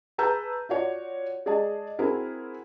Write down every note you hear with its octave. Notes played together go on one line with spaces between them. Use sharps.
G#4 B4 A5 A#5 E6 G6
F4 F#4 C#5 D5
G#3 G#4 D5 D#5 A5
C4 E4 F#4 G#4 A#4